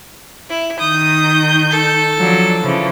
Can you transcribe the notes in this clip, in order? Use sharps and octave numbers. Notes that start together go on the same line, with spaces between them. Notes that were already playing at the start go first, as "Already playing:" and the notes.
E4
D#3 D#6 G6
A4
F3 F#3 D4
C#3 E3 F3